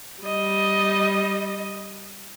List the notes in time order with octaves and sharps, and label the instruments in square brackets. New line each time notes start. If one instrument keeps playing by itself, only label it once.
[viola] G3 D#5